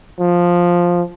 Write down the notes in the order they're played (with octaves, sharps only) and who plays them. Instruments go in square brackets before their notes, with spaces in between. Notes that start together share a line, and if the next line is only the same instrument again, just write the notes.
[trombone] F3